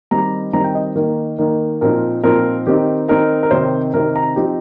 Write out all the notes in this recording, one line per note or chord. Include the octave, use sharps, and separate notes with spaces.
D#3 G3 C4 D#4 A#5
D#3 G3 C4 D#4 A#5
G5
D#5
D#3 A#3 D#4
D#3 A#3 D#4
A#2 F3 C4 D#4 A#4
A#2 F3 C4 D#4 A#4
D#3 C4 D#4 G4
D#3 C4 D#4 A#4
A#4
C3 D#3 C4 D#4 C5
C3 D#3 C4 D#4 A#4
A#5
F3 C4 D#4 G4